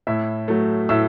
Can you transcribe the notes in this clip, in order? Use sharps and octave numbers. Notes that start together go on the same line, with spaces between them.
A2 E4 E5
F#3 A3
A2 E5 E6